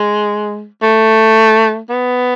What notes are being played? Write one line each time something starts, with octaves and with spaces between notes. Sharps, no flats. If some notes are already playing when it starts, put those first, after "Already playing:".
Already playing: G#3
A3
B3